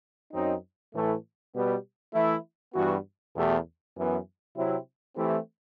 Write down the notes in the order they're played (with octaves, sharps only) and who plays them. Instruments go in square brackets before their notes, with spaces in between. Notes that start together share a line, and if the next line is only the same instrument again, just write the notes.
[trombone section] F#2 F#3 C4 D#4
A2 E3 A3
B2 G3 B3
E3 A3 E4
G2 E3 B3 F#4
E2 B2 A3 E4 G4
F#2 E3 B3
C3 F#3 C4 E4
E3 A3 C4 E4 G4